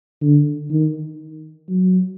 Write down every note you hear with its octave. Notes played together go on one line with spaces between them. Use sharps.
D3
D#3
F#3